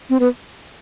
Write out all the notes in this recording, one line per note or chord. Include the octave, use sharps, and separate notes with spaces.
C4
B3